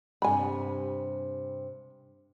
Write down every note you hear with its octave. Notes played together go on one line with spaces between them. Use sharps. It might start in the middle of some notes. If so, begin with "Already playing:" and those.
G2 C3 G#5 B5